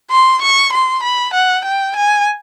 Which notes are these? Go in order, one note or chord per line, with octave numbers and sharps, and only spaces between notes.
C6
C#6
C6
B5
F#5
G5
G#5